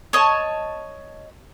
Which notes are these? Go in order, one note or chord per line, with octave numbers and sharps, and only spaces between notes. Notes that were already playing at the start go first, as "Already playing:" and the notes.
C#5 D#5 A5 C#6